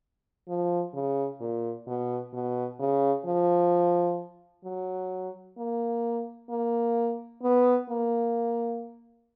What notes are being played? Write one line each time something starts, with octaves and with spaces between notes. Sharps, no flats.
F3
C#3
A#2
B2
B2
C#3
F3
F#3
A#3
A#3
B3
A#3